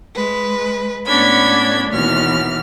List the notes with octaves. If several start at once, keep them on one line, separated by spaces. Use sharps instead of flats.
G#3 B4
A2 B3 C#4 D4 B5 G#6
D#2 B2 E3 F6